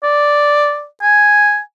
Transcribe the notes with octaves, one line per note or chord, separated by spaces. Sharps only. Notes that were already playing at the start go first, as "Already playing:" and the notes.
D5
G#5